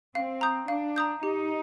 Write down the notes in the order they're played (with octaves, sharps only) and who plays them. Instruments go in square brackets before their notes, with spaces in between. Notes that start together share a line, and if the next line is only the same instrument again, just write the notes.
[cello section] C4 [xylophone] F5
[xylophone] A#5 D#6 G6
[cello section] D4 [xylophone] F5
[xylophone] A#5 D#6 G6
[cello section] D#4 [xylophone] G4